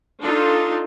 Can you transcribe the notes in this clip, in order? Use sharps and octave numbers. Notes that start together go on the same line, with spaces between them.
D4 D#4 F4 A4